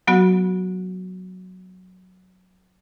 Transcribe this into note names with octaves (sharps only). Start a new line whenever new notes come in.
F#3 B3 F#4